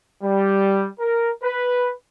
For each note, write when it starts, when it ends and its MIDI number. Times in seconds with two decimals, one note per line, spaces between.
0.23 0.87 55
0.99 1.30 70
1.44 1.93 71